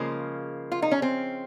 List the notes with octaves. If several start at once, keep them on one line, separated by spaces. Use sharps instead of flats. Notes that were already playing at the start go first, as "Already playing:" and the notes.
Already playing: C#3 F3 G#3 A#3
F4
D#4
C#4
C4